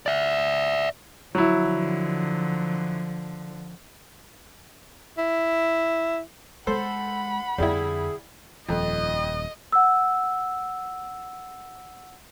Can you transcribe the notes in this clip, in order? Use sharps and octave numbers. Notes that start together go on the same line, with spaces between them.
D5 E5
D3 F3 F#3 E4
E4
G#3 A4 C5 F#5 B5
F2 D3 G3 E4 G#4
D#1 F2 F3 D#5
F#5 E6